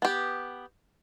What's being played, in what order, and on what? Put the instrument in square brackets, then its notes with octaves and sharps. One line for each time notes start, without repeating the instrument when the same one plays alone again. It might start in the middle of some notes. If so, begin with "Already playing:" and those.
[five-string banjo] B3 G4